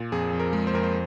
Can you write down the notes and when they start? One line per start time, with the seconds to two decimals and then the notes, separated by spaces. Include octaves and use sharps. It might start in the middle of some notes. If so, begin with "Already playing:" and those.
Already playing: A#2
0.12 F2 G#4
0.33 F2
0.40 A#4
0.53 G#3
0.67 C5
0.73 F2 A#4
0.83 C5